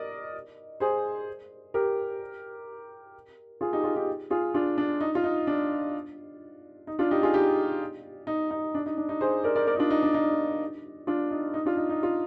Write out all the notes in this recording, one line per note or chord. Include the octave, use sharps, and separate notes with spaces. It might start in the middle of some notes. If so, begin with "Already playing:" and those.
Already playing: A#4 D5 D#5
G#4 C5
G4 A#4
F4 G#4
D#4 G4
F4 G#4
D#4 G4
F4 G#4
D4 F4
D4
D#4
F4
D#4
D4
D#4
D4 F4
D#4 G4
F4 G#4
D#4 G4
D#4
D#4
D4
D#4
D4
D#4
G#4 C5
A#4 D5
A#4 D5
A#4 D5
D#4
D4 F4
D#4
D4
D#4
D4 F4
D#4
D#4
D4 F4
D#4
D#4
F4